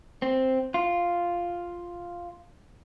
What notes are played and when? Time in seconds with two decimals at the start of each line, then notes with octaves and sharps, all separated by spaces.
0.22 C4
0.74 F4